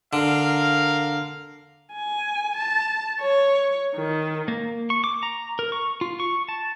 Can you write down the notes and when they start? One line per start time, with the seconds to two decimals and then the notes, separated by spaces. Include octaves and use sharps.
0.13 D3 A#4 F5
1.93 G#5
2.57 A5
3.21 C#5
3.95 D#3
4.48 A#3
4.90 C#6
5.04 D6
5.23 A#5
5.59 A#4
5.72 C#6
6.01 F4
6.20 C#6
6.49 A5